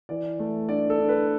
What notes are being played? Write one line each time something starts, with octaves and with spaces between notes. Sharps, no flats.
E3 D5
A3
D4 D5
A4
D4
B4